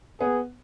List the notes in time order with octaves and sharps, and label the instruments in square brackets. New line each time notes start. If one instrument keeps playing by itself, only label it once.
[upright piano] B3 [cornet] G#4